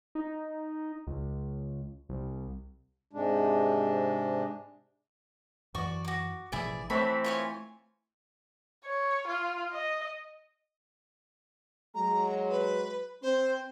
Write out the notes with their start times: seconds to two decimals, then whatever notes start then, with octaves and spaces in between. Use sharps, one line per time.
0.15 D#4
1.07 C#2
2.09 C2
3.13 G#2 C3 G#3 D4
5.75 F#2 E3 F#4 D5 C#6
6.05 F#4 D6
6.52 A1 B2 F3 E4 G#4 D5
6.90 E3 A3 C4 A4 C#5 B5
7.24 F4 C#5 G#5
8.85 C#5
9.27 F4
9.71 D#5
11.94 F#3 G#3 A#5
12.49 B4
13.22 C4 C5